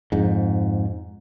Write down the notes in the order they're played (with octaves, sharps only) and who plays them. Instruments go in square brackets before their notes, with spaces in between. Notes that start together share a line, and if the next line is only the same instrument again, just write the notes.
[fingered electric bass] F2 G#2